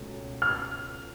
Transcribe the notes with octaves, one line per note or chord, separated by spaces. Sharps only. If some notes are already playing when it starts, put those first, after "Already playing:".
Already playing: C#2 B2 A3 C#4
F6